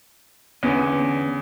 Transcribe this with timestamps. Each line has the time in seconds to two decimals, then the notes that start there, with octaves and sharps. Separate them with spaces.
0.63 E2 D3 B3 C#4